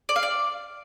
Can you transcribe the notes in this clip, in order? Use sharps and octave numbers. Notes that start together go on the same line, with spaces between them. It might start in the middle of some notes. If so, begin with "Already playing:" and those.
D5
F5
D5